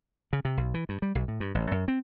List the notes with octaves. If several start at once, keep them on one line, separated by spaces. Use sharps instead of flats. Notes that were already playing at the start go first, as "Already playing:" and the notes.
C#3
C3
B1
E3
G2
G3
B1
A2
G2
A1
F#2
C4